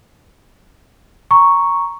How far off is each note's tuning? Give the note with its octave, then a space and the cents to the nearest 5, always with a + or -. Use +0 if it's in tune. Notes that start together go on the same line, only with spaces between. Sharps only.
A#5 +0 C#6 +0